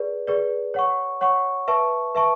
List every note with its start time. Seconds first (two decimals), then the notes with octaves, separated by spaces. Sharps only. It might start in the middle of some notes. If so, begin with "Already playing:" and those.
Already playing: G#4 B4 D5
0.27 G#4 B4 D5
0.74 C#5 F#5 C#6
1.21 C#5 F#5 C#6
1.68 B4 E5 A5 C#6
2.15 B4 E5 A5 C#6